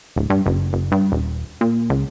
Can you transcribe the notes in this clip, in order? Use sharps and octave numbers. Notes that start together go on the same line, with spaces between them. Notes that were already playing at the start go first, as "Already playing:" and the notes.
D1
G2
F#1
F#1
G2
D#1
A#2
C#2